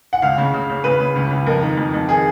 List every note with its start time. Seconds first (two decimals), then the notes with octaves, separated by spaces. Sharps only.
0.13 F#5
0.22 C#2 F5
0.38 C#3
0.54 C#3
0.70 C#3
0.84 C#3 B4
1.00 C#3
1.16 C#2
1.31 C#2
1.46 F2 A#4
1.62 D#3
1.77 F2
1.94 F2
2.08 D#3 G#4